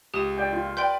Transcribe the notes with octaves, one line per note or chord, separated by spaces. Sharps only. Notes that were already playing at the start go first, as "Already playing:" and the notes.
C#2 G4 D#6 E7
D5 G5
F4
B4 D5 G5 C6 G6